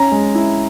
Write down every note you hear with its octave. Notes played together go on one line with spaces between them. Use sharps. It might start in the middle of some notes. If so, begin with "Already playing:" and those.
Already playing: C#4 A#5
G#3
E4